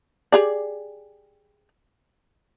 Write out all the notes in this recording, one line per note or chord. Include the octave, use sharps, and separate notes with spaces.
G4 G#4 D5